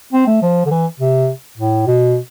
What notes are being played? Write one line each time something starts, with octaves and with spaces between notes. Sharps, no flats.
C4
A3
F3
D3
E3
C3
A2
B2